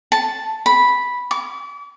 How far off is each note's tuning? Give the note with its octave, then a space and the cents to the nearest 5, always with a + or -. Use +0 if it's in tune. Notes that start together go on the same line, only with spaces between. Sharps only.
A5 +0
B5 -5
D6 -40